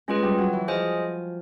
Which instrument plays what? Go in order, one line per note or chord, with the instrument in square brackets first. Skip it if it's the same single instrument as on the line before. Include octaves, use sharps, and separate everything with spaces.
[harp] G#3 [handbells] C#4 F4 G#4 B4
[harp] G3
F#3
E3
[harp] F3 [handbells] G#4 C5 D#5 G#5